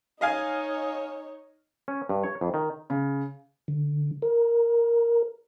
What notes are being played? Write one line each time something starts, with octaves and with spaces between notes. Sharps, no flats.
D#4 C#5 D#5 F5 G#5
C#4
G2
C#5
F2
D#3
C#3
D3
A#4